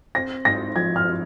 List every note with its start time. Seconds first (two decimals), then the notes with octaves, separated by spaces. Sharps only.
0.15 C4 A#6
0.45 G#2 A#6
0.75 F3 G#6
0.96 F6
1.06 C4